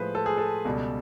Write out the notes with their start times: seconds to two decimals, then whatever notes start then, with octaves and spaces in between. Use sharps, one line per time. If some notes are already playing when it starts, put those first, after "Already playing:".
Already playing: A2 F3 G#3 B4 C5
0.15 A4
0.26 G#4
0.38 A4
0.65 C#2 B2 G3